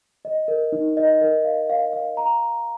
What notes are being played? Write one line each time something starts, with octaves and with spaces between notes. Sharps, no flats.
D#5
A#4
D#4
D#5
A#4
F5
F5
F5
A#5